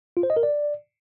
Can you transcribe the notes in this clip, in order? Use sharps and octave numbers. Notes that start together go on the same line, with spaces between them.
F4
C5
D#5
A#4
D5